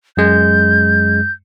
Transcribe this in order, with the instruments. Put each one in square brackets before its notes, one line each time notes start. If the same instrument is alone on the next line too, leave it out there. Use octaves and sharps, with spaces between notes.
[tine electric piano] F#2 G#3 [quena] G6